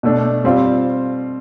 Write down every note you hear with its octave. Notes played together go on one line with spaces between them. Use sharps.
B2 A3 D4
G3 C4 F4 C5